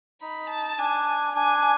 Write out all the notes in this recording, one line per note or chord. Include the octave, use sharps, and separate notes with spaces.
D#4 B5
A5
D4 G#5
G#5
D4 G#5